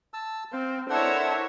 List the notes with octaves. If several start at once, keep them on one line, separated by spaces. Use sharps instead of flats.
A5 E6
C4 C5 F5
D4 E4 A4 A#4 C5 C#5 E5 F#5